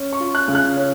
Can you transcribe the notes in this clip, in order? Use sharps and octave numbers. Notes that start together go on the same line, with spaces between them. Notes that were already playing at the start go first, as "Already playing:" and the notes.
Already playing: C#4
C#6
F4
F#6
C#3
F#6
C#4